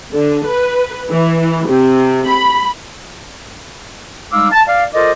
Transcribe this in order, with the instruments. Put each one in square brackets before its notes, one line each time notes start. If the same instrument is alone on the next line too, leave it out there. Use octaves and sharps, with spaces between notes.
[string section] D3
B4
E3
C3
B5
[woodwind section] G3 G#3 D#4 F5 D6 E6
A5
D5 F5
F4 A4 A#4 C5 D5 D#5